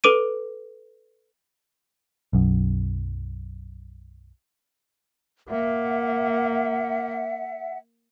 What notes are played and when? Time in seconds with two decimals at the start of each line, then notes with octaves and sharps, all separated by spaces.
0.04 A4 B4 D6 D7 D#7
2.33 B1 F#2
5.48 A#3 E5 F#5